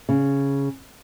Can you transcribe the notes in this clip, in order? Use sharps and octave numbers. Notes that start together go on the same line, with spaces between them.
C#3